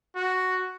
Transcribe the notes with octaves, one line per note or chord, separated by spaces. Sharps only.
F#4